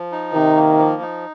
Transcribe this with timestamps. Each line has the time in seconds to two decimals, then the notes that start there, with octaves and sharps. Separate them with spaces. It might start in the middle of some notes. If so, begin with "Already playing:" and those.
Already playing: F3
0.12 D#4
0.34 C3 D#3
0.56 A#3
0.78 F3
1.01 D#4